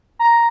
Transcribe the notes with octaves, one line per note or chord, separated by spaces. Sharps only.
A#5